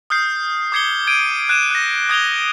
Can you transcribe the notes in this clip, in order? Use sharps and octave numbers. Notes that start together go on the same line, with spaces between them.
D#6 F6 G6 C7
D6 D#6 G#6 C7 C#7 G7
G#6 D7 D#7
F#6 G#6 D#7 E7
F#6 A#6
D#6 G#6 F7 G7